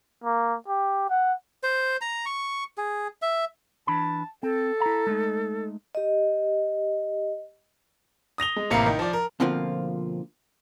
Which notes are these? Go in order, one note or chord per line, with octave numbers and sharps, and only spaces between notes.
A#3
G4
F#5
C5
A#5
C#6
G#4
E5
E3 D4 A5 B5
C4 A4
E4 A#5
G#3 A3 D#4
G4 D#5
D#6 A#6 F7 G7
G#3
A1 C3 A#3 A#4 F5 C#7
D#3
F3 D5
A#4
B2 D3 F3 A#3 C4 F4